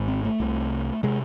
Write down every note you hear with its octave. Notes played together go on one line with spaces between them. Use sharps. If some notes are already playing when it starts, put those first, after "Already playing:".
Already playing: G#1 G#2
C4
A3
C2 C3
C3 G#3